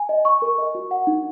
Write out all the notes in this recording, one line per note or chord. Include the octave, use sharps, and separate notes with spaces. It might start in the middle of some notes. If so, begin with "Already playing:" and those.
Already playing: G#5
D#5
C#6
A#4
D#5
F#4
F#5
D#4